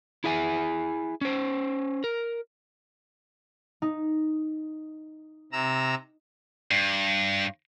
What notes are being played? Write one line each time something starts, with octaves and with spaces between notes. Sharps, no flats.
E4 G#4 E5 G#5
C#4 C5
A#4
D#4
C3 A#5 E6
G2